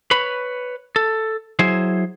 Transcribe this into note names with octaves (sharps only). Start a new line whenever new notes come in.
B4 C#5 B5
A4
F#3 E4 G#4 C5